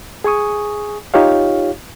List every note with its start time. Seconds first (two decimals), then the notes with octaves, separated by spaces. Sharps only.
0.24 G#4 G#5 C#6 D#6
1.14 D#4 F4 G4 C#5 F5